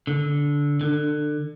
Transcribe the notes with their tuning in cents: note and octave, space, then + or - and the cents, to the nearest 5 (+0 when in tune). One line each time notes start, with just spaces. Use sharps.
D3 -15
D3 +25